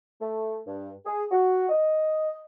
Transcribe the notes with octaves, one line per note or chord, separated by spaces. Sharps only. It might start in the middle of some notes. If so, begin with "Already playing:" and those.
A3
G2
G#4
F#4
D#5